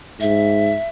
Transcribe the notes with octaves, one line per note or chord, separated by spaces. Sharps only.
G#2 E5